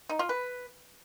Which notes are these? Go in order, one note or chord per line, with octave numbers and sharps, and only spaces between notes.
D#4
F4
B4